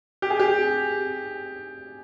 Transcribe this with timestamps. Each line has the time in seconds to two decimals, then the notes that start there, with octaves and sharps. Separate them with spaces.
0.22 G4
0.30 G#4
0.39 G4